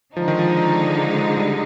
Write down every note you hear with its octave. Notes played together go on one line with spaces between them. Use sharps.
D3 F3 G#3 D#4
D#3
F3
G3